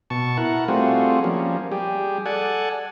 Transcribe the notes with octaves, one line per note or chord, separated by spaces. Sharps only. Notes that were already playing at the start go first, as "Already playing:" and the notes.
B2 A5 C#6
E4 A#4 F#5
G3 A3 C4 F4 F#4 G#4
F3 G3 A#3 C#4
G3 G4 G#4
A4 D5 F#5 G#5